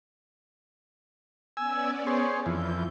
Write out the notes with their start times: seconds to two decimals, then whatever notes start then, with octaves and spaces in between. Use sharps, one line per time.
1.57 B3 C#4 D5 G#5 E6
2.07 G#4 C5 C#5
2.46 F2 E3 G6